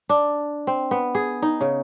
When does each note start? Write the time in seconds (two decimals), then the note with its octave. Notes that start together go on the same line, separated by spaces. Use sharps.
0.09 D4
0.67 C4
0.91 B3
1.15 G#4
1.42 D#4
1.61 C#3